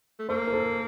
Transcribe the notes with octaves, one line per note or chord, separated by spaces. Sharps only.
A3
A#3 A4 C5
A#4
A4 C5